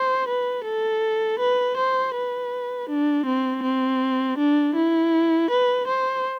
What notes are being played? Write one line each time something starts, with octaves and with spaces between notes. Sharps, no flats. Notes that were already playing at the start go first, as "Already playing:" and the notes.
Already playing: C5
B4
A4
B4
C5
B4
D4
C4
C4
D4
E4
B4
C5